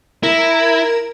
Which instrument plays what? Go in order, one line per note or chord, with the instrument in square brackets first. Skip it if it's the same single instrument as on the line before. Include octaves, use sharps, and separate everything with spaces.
[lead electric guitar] E4 [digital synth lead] A#4